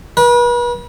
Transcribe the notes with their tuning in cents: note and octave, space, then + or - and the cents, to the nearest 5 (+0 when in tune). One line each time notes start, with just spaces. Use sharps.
B4 -40